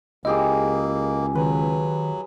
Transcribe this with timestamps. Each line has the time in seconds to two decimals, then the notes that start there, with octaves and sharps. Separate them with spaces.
0.25 C#2 A#3 E4 G4 G#4 D#5
1.35 D#3 F#3 B4